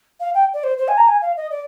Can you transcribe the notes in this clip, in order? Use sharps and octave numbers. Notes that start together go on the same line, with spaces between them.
F5
G5
D5
C5
C5
G#5
A#5
G#5
F5
D#5
D5